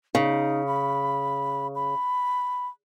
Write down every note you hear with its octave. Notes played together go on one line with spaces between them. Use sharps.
C#3 D#4
B5
B5